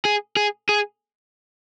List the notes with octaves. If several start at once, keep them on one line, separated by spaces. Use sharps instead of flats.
G#4
G#4
G#4